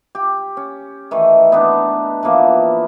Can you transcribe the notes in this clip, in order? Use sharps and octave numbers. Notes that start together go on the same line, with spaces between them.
G4
C#4
D#3 E3 A3
B3 D4 D#4
E3 F3 A#3 B3